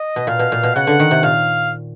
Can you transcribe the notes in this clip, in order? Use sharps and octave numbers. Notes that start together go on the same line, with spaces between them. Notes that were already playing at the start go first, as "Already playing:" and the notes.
Already playing: D#5
B2
A#2 F5
B2
A#2
B2
C#3 F#5
D3
D#3
C3
A#2 F5